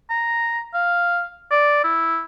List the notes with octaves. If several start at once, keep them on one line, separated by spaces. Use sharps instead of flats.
A#5
F5
D5
E4